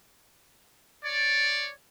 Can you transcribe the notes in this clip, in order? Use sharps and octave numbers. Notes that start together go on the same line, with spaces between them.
C#5 D5